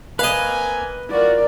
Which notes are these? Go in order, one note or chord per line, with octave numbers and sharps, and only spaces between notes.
A#3 C4 B4 D#5 F5 G#5
F4 F#4 A#4 D5